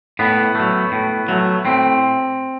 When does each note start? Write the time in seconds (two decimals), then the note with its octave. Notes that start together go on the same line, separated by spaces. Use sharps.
0.19 A2 B3
0.55 F#3 A3
0.92 A2
1.28 F#3 A3
1.65 A2 C4